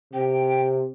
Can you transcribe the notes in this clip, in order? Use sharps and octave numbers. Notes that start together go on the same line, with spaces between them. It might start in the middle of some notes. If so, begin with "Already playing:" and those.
C3 G5